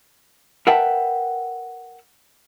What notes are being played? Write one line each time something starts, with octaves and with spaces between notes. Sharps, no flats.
A#4 B4 E5 F#5 G5 A5